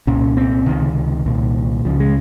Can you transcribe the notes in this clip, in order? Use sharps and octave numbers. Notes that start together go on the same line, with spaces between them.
C2 A#2 C#4
C4
C#2 C3 D#3
C2 A#2
C#2 C#3 F3
G#3